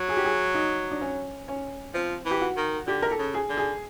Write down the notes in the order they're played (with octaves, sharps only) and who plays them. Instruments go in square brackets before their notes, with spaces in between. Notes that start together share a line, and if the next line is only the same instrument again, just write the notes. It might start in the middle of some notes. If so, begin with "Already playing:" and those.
Already playing: [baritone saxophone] F#3
[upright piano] G#4
G4
G#4
D#4
D4
C#4
C#4
[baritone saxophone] F3 [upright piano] C4
[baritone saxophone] E3
[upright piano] G4
F#4
[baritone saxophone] D#3
[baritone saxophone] D3 [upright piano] G4
[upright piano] A#4
A4
[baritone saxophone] C#3
[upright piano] G#4
[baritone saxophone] D3
[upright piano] G#4